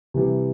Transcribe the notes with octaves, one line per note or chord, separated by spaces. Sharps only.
C3 E3 G3